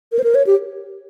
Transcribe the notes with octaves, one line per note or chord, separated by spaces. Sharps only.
A#4
C5
A#4
C#5
G4